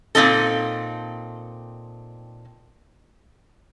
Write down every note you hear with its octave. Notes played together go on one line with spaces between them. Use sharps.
A#2 F3 C4 D#4 A4